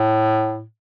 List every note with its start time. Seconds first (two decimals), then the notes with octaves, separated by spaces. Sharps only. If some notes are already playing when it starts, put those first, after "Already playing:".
Already playing: A2